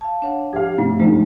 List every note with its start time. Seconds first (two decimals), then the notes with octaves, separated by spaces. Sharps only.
0.01 F5 A5
0.22 D4 C#5 F#5
0.53 F3 G4 F5
0.78 G2 C3 A3
1.00 D3 D#3 F3 G#3 A#3